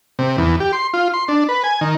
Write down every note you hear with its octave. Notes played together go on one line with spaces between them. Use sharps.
C3
E2
G4
C6
F4
C6
D4
B4
G#5
D#3